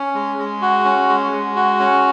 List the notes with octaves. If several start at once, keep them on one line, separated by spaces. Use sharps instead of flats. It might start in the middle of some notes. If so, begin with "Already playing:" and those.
Already playing: C#4
G#3
G#3
F#4
C#4
G#3
G#3
F#4
C#4